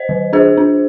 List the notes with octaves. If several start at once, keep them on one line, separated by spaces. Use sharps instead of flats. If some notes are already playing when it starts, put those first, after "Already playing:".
Already playing: C5 D#5
D#3
D4 G#4 C5
D4